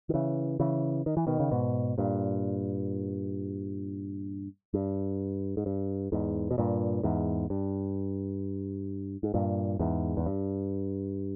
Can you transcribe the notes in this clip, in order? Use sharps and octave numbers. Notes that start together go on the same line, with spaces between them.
D#3
C#3 E3
C#3 E3
D#3
E3
B2 D#3
C#3
G#2 B2
G2 A#2
G2
G#2
G2
E2 G#2
B2
G2 A#2
E2 G#2
G2
G#2
G2 A#2
E2 G#2
E2
G2